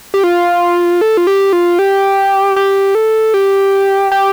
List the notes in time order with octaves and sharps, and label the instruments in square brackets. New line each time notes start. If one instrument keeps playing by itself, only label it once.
[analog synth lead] G4
F4
A4
F4
G4
F4
G4
G4
A4
G4
G4